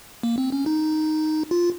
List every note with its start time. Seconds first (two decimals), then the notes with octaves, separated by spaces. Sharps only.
0.23 A#3
0.38 C4
0.52 C#4
0.66 D#4
1.51 F4